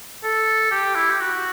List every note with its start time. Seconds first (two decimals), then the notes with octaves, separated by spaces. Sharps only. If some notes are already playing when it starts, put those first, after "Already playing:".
0.23 A4
0.71 G4
0.95 E4
1.10 G4
1.20 F#4